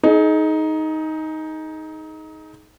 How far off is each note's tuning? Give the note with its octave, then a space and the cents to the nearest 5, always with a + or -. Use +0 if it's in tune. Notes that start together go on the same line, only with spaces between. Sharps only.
D#4 +10 G#4 +35